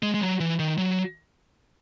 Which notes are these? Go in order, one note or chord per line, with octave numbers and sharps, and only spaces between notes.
G#3
G#3
F#3
E3
D#3
F#3